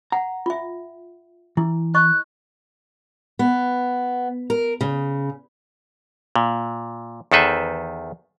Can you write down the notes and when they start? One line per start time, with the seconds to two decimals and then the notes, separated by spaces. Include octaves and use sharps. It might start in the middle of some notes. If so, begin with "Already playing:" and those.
0.12 F#5 A#5
0.46 F4 E5
1.57 E3 E4
1.95 D#5 C#6 F#6
3.39 B3
4.50 A#4
4.81 C#3
6.36 A#2
7.32 E2 D#3 A4 B4 C5 E5